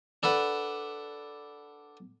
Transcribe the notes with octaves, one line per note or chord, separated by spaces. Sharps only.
D4 A4 B4 F#5